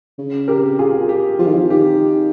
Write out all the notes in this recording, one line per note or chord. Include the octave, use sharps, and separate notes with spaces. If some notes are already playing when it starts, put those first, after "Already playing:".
C#3
G4 A#4
F4 G#4
G4
F3 F4
D#3
F3
D#3 G4